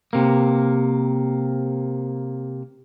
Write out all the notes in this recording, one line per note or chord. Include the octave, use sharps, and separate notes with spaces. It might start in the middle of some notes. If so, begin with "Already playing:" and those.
C3 A#3